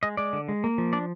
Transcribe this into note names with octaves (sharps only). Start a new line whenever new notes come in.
G#3 D#5
G#3 D5
D3
G#3
A#3
F3
D4 D5